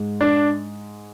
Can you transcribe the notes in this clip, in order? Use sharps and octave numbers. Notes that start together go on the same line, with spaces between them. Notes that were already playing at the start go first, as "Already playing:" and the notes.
Already playing: G#2 G#3
D4